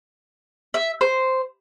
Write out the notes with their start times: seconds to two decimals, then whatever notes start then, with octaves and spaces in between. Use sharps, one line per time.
0.74 E5
1.01 C5